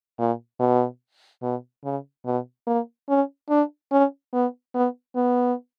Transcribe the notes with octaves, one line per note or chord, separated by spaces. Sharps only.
A#2
B2
B2
C#3
B2
A#3
C#4
D4
C#4
B3
B3
B3